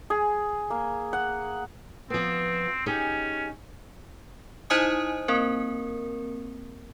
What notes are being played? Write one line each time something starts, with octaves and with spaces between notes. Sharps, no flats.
G#4
A#3
F#5
F3 B3 C4
C#4 D#4 G4 G#4
D#4 E4 C5 D#5 G#5 D#6
A#3 C4 A#4